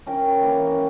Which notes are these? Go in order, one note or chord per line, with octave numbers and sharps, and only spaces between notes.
C#4 A#4 G5
E3 A#3 E4 A#4
C#4